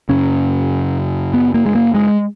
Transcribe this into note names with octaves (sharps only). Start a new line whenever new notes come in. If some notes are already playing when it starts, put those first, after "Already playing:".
F#2 C#3 C#4
B3
A#3
G#3
A#3
G#3